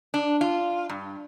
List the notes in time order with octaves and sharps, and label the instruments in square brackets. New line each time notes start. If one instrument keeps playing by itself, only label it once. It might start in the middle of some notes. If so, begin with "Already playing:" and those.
[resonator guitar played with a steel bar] D4
F4
G2